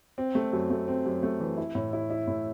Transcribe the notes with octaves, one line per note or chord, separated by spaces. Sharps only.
C4
A3
F#2
A3
C4
F#2
A3
E3
E4
A2
E4
E4
A2